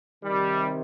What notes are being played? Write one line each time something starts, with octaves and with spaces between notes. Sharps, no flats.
C3 D#3 G3